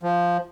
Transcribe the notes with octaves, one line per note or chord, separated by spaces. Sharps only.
F3